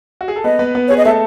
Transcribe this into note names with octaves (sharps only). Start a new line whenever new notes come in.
F#4
G#4
A4
B3 B4 D#5
B3 B4
B3 B4
G#4 C#5
D#5
A3 A4 E5